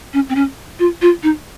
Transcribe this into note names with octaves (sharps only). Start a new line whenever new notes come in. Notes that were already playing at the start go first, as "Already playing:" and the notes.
C#4
C4
C#4
F4
F4
D#4